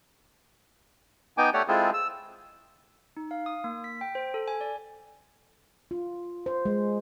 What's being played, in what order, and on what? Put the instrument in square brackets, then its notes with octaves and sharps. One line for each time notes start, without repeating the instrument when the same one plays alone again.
[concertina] B3 D#4 G5 G#5 D6
A3 G4 C#5 D5 F#5
G#3 C4 E4 F4 G#4 A4
E6
[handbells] D#4
F5
D#6
A#3
B6
G5
C5
A4
G#5
D5
[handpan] F4
C5
G#3